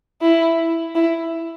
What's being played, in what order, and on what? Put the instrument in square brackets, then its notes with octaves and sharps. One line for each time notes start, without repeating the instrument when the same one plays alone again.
[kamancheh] E4
E4